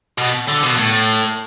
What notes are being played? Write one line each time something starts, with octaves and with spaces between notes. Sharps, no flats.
B2
D3
B2
A2